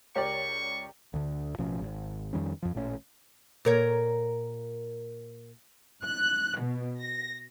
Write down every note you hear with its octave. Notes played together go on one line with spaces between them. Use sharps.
C#2 G4 A#4 C#5 D5 C#6 A#6
D2 D3
A1 B2 F3 C#4
G#1
F2 D#3 G3 C#4
F2 F3
A1 A#2 A3 C#4
A#2 A#4 C#5
F#6
B2
A#6